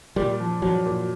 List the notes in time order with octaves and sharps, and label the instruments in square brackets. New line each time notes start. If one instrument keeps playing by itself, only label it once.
[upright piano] A#2 [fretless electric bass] G3
[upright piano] F3
[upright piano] F3 [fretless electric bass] F#3
[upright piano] A#2